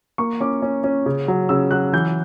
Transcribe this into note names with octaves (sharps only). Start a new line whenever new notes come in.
A#3 C#6
C#4 D6
C#4
C#4
C#3
F#3
C#3 E6
F#3 F#6
E3 G6